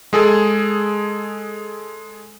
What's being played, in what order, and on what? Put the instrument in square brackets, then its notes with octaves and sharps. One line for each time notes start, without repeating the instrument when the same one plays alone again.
[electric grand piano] G#3 G#4 A4